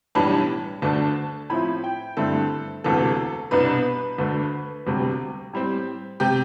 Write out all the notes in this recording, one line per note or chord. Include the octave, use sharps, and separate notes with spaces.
B1 A2 E3 G3 D4 A5
D2 D3 A3 D4 A5
A2 F3 C4 E4 B5
G5
G2 D3 A3 C4 E4 A4
E1 D2 C3 E3 A4
C2 B2 B3 D4 B4
D2 D3 A3
E1 D2 C3 G3
A2 G3 C4
C3 G4